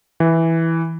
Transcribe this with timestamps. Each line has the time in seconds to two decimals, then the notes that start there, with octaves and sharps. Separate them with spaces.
0.20 E3